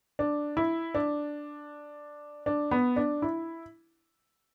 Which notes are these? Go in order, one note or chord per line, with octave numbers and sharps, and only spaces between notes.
D4
E4
D4
D4
B3
D4
E4